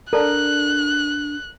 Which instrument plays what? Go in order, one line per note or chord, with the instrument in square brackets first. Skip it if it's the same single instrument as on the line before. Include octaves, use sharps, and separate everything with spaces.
[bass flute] D4 [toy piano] A4 D5 A5 [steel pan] A#4 [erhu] F#6